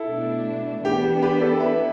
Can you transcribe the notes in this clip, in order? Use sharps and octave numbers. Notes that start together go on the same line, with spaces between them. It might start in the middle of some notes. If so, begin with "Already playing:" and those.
Already playing: E4 A4
B2 A3 D4
E3 B3 D4 G4
G4 B4
A4 D5
B3 E4 B4 E5